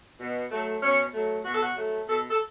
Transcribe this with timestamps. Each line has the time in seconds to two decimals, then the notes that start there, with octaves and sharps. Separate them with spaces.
0.19 B2
0.50 F#3 A3
0.82 B2 C#4
1.13 F#3 A3
1.44 B2 F#4
1.54 A4
1.61 F#4
1.75 F#3 A3
2.07 B2 A4
2.29 A4